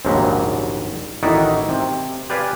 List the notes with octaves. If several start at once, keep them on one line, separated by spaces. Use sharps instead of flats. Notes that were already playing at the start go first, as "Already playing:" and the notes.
A#1 D#2 G#2 C#3 F#3 G3
A1 D#3 D#4 E4 F#4 D5
C3
G4 B4 D5 F5 G#5